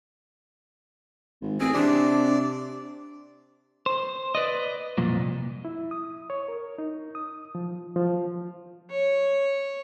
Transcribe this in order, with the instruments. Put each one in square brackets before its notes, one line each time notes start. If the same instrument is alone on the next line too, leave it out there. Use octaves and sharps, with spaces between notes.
[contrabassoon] G#1
[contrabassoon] A1 [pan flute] C4 [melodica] G#4
[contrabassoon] C3 [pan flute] D4 [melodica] D5
[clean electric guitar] C5
B4 D5 D#5
C2 F2 A#2
[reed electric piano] E4
D#6
C#5
A#4
D#4
D#6
F3
F3
[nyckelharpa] C#5